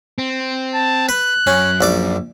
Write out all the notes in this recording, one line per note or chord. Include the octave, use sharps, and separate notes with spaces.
C4
A5
B4 F#6
F#2 C#4
A#1 D5 D6